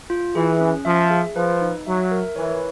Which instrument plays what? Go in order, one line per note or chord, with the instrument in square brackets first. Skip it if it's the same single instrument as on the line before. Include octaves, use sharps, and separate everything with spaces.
[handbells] F4
[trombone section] E3 [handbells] G#4
[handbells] C#4
[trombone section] F3 [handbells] E5
[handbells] G#4
[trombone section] F3 [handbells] B4
[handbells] D#4
[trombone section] F#3 [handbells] E5
[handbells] A#4
[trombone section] E3 [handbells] C#5